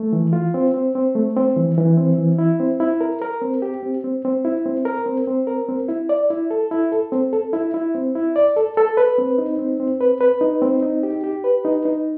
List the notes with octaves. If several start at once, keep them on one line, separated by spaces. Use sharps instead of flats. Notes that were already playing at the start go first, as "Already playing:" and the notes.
Already playing: A3
E3
F4
C4
C4
C4
A3
C4
E3
E3
C4
E3
E4
C4
E4
A#4
A#4
C4
G4
C4
C4
C4
E4
C4
A#4
C4
C4
A#4
C4
E4
D5
E4
A4
E4
A4
C4
A4
E4
E4
C4
E4
D5
A4
A4
B4
C4
D#4
C4
C4
B4
B4
D#4
C4
D#4
G4
G4
B4
D#4
D#4